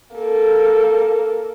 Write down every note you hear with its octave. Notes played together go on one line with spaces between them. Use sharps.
A#3 A4